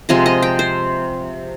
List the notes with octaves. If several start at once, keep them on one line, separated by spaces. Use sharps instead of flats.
C3 F3 G#3 D#5
D#5
G5
C5